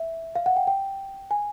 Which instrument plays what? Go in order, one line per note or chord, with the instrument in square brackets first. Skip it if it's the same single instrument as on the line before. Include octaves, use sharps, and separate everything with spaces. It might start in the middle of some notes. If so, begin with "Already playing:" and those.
Already playing: [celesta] E5
F5
F#5
G5
G5
G#5